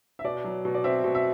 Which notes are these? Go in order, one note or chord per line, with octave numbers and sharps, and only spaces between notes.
E5
B2 D5
F#3
B2
D5
C4 E5
B2
E5